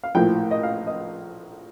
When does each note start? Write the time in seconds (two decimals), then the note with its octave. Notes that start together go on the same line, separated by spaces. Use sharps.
0.03 F5
0.15 A#1 A2 F3 G5
0.51 D#5
0.63 F5
0.87 D#5